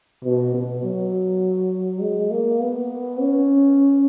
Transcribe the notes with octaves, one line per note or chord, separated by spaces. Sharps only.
B2
B2
F#3
G#3
A#3
B3
C#4